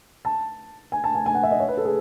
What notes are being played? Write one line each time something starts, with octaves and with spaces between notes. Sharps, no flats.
A5
G#5
A5
G#5
G#5
F#5
E5
D#5
C#5
B4
A4
G#4